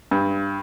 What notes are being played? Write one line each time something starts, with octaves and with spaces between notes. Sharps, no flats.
G2